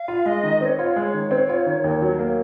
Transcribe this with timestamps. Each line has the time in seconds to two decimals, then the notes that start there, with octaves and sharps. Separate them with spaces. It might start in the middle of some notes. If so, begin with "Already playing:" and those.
Already playing: F5
0.08 F4
0.26 G#3 D#5
0.43 D#3
0.61 C4 D#5
0.65 C#5
0.79 F4
0.96 G#3
1.14 D#3
1.31 C4
1.49 F4
1.66 D#3
1.84 D#2
2.02 F#3
2.19 A#3